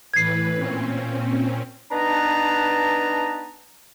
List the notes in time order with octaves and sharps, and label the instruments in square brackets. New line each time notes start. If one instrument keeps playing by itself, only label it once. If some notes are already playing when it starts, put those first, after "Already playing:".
[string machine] A2 E3 B4 [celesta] G#6 C7
[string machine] A#2 C4 C#4
[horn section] B3 D4 D#4 B4 A5 A#5